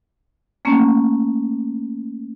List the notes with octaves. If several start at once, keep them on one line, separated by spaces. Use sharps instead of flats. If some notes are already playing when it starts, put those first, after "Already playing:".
A3 A#3 C#4